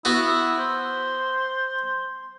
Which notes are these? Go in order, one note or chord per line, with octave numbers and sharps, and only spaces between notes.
B3 E4 F#4
C5